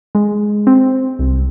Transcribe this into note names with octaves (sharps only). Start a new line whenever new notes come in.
G#3
C4
C2